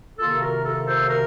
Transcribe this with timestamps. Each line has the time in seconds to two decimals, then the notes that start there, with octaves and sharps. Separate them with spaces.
0.19 C3 D#3 A#3 F4 A4
0.41 F#4 A#4
0.64 F4 A4
0.86 A4 C5
1.09 F#4 A#4